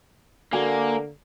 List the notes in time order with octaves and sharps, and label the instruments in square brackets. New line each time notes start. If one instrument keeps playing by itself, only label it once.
[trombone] D3 [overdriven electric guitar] A#3 [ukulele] F#4 G#4 G#5